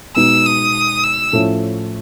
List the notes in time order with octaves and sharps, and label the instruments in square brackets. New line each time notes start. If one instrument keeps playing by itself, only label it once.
[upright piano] B2 G#3 B3 D#4 [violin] E6
[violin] D#6
E6
[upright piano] A2 F3 A3 C#4